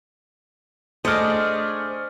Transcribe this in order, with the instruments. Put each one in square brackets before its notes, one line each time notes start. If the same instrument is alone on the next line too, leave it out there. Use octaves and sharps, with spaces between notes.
[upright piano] A3 F6 [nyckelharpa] D4 G#4 [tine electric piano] C5 D6 [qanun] D#5